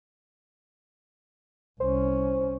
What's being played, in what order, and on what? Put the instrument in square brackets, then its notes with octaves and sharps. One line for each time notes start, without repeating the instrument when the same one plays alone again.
[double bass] C2 C#4 [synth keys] C5